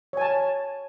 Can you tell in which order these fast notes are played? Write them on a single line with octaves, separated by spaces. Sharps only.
C#5 G#5 A5